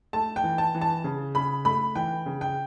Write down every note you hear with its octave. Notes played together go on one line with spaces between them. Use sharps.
A3 A5
G5
E3
A5
E3
A5
C#3
C#3 B5
A3 B5
E3 G5
C#3
G5